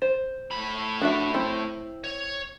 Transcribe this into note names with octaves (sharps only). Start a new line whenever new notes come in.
C5
A2 B5
D4 F#4 E5
C4 E4
C#5